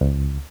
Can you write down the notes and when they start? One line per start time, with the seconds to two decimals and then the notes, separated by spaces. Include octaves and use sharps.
0.01 C#2